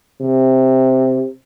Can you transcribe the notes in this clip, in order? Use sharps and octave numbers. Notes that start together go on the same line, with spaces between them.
C3